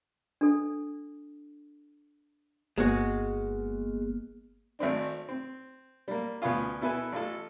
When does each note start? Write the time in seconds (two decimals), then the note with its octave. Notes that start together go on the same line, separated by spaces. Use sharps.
0.41 D4 A4
2.78 G1 G#3 A#3 B3 F#4
4.79 G#1 A3 C4 D4
5.29 C4
6.08 G3 A#3
6.42 D2 B3 C#4 F4
6.81 B2 E4 A4 B4 G#5
7.13 A1 F4 A4